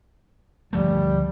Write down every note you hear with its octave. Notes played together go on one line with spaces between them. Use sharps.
D2 F3 G3 A3